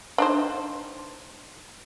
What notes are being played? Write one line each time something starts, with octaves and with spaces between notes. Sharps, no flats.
D4 D#4 C5